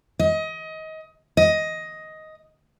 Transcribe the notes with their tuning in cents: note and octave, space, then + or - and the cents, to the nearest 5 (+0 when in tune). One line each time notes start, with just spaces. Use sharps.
D#5 +25
D#5 +10